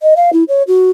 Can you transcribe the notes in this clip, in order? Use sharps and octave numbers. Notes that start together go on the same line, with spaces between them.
D#5
F5
E4
C#5
F#4